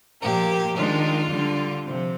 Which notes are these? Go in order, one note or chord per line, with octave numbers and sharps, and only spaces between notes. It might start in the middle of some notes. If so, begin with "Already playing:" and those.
A#2 F3 A#3 G4
D#3 G#3 D4 F4
D3 G3 D4
C3 F3 C4